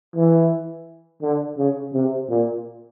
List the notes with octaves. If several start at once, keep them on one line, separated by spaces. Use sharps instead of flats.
E3
D3
C#3
C3
A#2